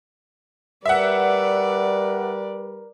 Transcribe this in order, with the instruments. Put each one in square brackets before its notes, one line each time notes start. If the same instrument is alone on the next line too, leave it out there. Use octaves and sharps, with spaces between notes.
[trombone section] G3 A#4 B4 [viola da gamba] D5 [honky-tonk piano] E5 F#5